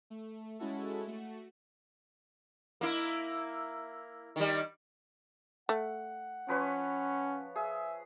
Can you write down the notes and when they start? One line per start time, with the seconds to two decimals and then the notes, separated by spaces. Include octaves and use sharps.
0.10 A3
0.59 G#3 C#4 E4 F#4 A4
1.07 A3 F#4
2.81 A#3 E4
4.36 D#3 G3
5.69 A3 F#5
6.48 F3 C#4 B4 C#5
7.56 G#4 E5